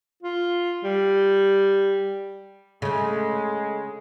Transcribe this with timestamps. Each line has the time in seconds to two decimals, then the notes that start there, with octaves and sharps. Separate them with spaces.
0.23 F4
0.84 G3
2.82 C#3 G#3 A3